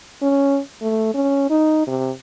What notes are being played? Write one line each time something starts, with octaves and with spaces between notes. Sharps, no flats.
C#4
A3
C#4
D#4
C3